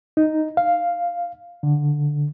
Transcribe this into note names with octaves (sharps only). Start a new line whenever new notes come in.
D#4
F5
D3